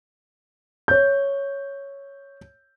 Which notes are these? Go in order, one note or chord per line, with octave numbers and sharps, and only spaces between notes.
C#5 G6